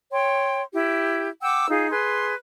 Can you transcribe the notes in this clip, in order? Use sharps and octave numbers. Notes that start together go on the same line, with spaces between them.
C#5 G5 C6
E4 G4
F#5 G5 D6 E6
D#4 F4 G#4
G#4 B4 C6